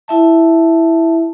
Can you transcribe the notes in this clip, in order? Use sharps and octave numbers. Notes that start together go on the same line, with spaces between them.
E4 E5 A5